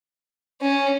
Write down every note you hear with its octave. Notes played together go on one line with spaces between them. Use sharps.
C#4